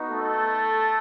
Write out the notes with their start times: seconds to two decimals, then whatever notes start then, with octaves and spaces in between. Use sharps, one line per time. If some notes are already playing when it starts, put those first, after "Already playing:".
Already playing: B3 D#4 F#4
0.10 A3 A4